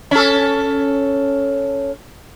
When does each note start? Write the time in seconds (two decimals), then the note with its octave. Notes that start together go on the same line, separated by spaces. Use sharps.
0.11 C#4 A4